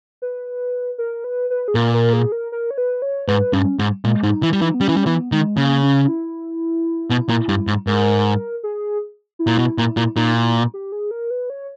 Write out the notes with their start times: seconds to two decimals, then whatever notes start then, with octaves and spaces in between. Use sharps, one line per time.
0.22 B4
0.98 A#4
1.24 B4
1.50 B4
1.68 G#4
1.75 A#2 A#4
1.94 A#4
2.13 G#4
2.32 A#4
2.52 A#4
2.71 C#5
2.78 B4
3.02 C#5
3.27 G#2 B4
3.53 G2 C#4
3.79 G#2
4.04 A#2 G#3
4.23 G#2 D#4
4.42 E3 E4
4.53 G3
4.62 E3 D#4
4.74 B3
4.81 G3 C#4
4.89 E3
4.97 G3
5.06 E3 B3
5.32 D#3 G#3
5.57 C#3 A#3
5.83 C#4
6.08 E4
7.10 B2
7.29 A#2
7.49 G2
7.67 G#2
7.87 G#2 A#4
8.63 G#4
9.39 E4
9.47 A#2
9.59 B2
9.78 A#2
9.97 A#2
10.16 A#2 D#4
10.35 E4
10.74 G4
10.92 G#4
11.11 A#4
11.30 B4
11.50 C#5